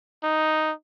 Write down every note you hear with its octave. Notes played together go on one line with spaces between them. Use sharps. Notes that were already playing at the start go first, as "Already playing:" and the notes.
D#4